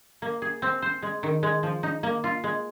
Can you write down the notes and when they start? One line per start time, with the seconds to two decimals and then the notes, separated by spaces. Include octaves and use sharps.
0.22 A#3
0.42 G#4
0.62 C4
0.82 C5
1.02 G#3
1.23 D#3
1.43 G#3
1.63 F3
1.83 D#4
2.03 A#3
2.24 F4
2.44 G#3